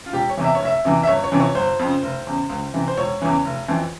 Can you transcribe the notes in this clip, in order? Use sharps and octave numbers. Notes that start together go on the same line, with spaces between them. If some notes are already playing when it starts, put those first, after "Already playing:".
F4
E1 G4
C#5
E2 C3 E3
E5
C#5
F1
E5
E2 C3 E3
E5
G1 C#5
C#5
F2 C3 E3
C#5
G1 C5
F2 C#3
F1
E2 C#3
C#2
C3 E3
C5
E1 C#5
E2 C#3 E3
F1
F2 E3